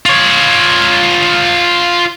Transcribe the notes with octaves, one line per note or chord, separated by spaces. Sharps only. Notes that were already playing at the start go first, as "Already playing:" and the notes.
F4 C#5